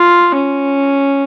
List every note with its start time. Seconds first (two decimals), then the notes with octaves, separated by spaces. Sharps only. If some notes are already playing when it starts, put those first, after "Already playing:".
Already playing: F4
0.35 C#4